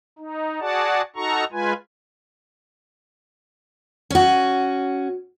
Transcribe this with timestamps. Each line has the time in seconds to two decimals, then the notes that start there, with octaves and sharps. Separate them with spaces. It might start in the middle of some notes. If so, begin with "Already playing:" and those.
0.19 D#4
0.60 F#4 G#4 D5 F#5 A5
1.16 D#4 F#4 A4 A#5 C#6
1.52 G#3 F4 B4 G#5
4.10 C#4 F#4